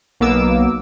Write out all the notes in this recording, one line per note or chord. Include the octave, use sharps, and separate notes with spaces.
B1 A#3 B3 D6 E6